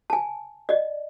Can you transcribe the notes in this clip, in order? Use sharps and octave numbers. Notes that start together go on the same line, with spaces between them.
G#5 A5
D5 D#5